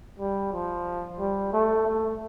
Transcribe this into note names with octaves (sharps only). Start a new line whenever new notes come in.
G3
F3
G3
A3
A3